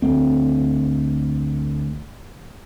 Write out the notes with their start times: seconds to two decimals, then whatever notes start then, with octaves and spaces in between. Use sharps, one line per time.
0.02 D2 A3 C4